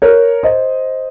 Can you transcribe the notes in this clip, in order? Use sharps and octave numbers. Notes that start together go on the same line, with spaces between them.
A#4 C#5
C5 D#5